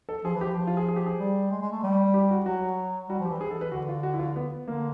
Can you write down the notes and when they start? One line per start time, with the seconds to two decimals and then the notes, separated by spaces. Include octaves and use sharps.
0.09 A4
0.24 F3 G#4
0.36 E3
0.41 G4
0.45 F3
0.56 F3
0.67 F4
0.77 G#4
0.88 G#4
0.96 G4
1.06 G#4
1.19 G3
1.51 G#3
1.62 G#3
1.72 A3
1.83 G3
2.14 G4
2.31 F#4
2.45 F#3 F#4
3.09 G3 F#4
3.20 F3
3.25 G4
3.30 E3
3.41 G#4
3.51 A4
3.61 B4
3.72 D3 F#4
3.89 F4
4.03 F#4
4.14 E4
4.19 F4
4.36 B3
4.66 D3 A#3